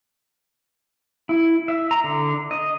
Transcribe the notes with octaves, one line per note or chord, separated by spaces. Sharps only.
E4
E5
A#5
D3
D#5